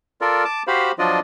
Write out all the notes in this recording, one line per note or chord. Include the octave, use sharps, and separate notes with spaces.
F4 A4 A#4 D5
A5 D6
F#4 G4 C5 F5 B5
F3 F#3 D4 F4 D5 D#5